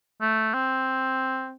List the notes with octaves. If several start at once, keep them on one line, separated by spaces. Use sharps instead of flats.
A3
C4